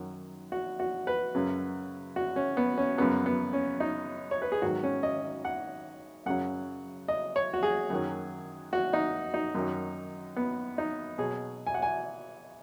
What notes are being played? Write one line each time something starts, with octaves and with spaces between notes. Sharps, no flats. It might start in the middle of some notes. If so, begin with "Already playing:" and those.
Already playing: F#2 D#3 F#3
F#4
F#4
B4
F#2 C#3 F#3
F#4
C#4
B3
C#4
F#2 C#3 F#3 B3
B3
C#4
D#4
C#5
B4
G#4
G#2 D#3 F#3 F#4
C#4
D#5
F#5
F#2 C#3 F#3 F#5
D#5
C#5
F#4
G#4
F#2 D#3 F#3
F#4
D#4
D#4
F#2 D#3 F#3
B3
D#4
B2 F#3 G#4
G#5
F#5
G#5